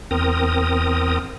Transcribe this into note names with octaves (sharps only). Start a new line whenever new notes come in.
E2 C4 A#4 D#6